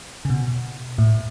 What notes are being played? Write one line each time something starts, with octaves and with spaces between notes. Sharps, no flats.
C#3
B2
A2